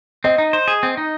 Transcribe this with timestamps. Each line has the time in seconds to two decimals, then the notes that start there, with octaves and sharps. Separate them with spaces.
0.24 C4 D#5
0.38 D#4
0.53 C5
0.68 G#4
0.83 C4
0.97 D#4